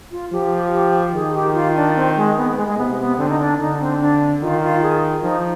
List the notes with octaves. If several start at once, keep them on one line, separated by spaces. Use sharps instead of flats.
F4
F3 G4
G4
D#3 G#4
G4
F4
D4
C4
G#3
B3
B3
G#3
G#3
C3 B3
B3
D3 C4
D#4
D4
D3 D#4
C4
D4
D#3 F4
F4
G#4
F3 D#4